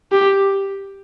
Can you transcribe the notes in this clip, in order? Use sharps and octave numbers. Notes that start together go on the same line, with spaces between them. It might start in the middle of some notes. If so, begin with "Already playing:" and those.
G4